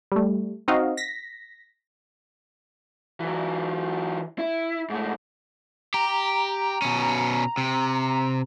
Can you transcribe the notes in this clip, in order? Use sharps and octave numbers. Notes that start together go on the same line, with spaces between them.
G3 A3
C4 D#4 F#4 D#5 F5
A#6 B6
E3 F#3
E4
G#2 A3
G4 A#5
B2 C#4
C3